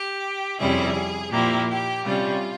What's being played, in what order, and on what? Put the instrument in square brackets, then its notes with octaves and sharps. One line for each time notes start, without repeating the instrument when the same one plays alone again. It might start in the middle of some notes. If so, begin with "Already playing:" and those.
Already playing: [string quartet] G4
F2 C3 G3 C#4 E4 G#4
A#2 F3 A#3 E4 G4
G4
C3 G3 C#4 F4